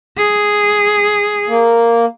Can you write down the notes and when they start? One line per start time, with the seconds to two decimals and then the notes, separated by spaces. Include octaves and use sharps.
0.17 G#4
1.48 A#3